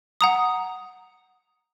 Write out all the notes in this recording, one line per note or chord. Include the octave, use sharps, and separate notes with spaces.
F#5 A#5 D#6